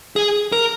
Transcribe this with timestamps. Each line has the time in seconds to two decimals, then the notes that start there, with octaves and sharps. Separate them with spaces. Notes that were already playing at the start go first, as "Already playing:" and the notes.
0.16 G#4
0.52 A#4